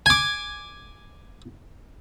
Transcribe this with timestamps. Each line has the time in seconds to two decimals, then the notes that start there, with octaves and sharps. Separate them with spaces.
0.06 G#5 D6